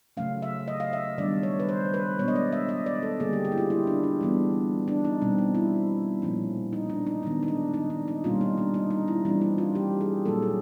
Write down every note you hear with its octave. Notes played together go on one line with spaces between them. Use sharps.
C#3 F#3 A3 C#4 F5
E5
D#5
F5
E5
D#3 G3 B3 D4 D5
C#5
B4
C5
B4
B2 G#3 B3 D4 C#5
D#5
D5
E5
D#5
D5
A4
D3 G3 A#3 D4 G#4
G4
G4
E4
F4
E4
D4
D4
E3 G3 B3 D4
D4
D#4
B2 G3 C4
D#4
E4
A#2 F3 A#3 C#4
D#4
D4
D#4
D#3 G#3 B3 D4
D#4
D4
D#4
D4
D#4
B2 G3 A#3 C#4 F4
D#4
D4
D#4
D#4
E4
E3 G3 C4 D4
D#4
F4
G4
G#4
A#2 F#3 A#3 A4
G#4